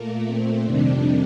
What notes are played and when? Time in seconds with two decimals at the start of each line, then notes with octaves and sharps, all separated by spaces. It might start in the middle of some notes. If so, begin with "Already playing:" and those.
Already playing: A#2 A3 A#3
0.27 C4
0.64 F2 C3 D#3 G3 D4